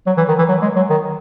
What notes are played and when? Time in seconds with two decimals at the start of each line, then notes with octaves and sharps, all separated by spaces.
0.07 F#3
0.17 E3
0.28 D#3
0.38 E3
0.49 F#3
0.62 G#3
0.76 F#3
0.90 D#3